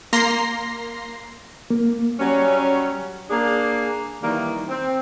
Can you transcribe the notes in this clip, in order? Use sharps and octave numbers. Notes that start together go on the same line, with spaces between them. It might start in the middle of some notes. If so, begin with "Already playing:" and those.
A#3 A#5 C6 A#6 C7
A#3
F#3 G3 C#4
A#3 D4 G#4
D#3 E3 G3 A#3
C4